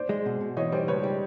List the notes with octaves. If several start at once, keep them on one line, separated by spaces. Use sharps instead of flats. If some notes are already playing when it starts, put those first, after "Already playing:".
Already playing: C5 D5
G#3
B2
B2
E3 C#5 D#5
G3 C5 D5
C#2 B4 C#5
G3